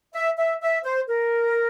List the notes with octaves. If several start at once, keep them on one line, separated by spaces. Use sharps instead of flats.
E5
E5
E5
C5
A#4